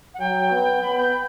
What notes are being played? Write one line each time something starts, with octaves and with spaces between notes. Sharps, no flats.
F#5
F#3 G5
B3
B3 B5
G6